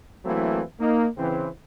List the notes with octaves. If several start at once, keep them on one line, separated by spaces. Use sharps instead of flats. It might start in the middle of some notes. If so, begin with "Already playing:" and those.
E3 F#3 A3 A#3 C4 E4
A#3 D#4
C#3 E3 C4